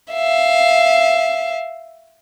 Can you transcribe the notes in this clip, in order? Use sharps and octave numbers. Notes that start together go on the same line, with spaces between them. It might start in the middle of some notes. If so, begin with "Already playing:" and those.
E5 F5